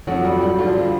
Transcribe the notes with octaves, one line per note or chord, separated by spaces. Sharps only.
F2 F#3 F#4
G3
G3
D3 F3 F4
D3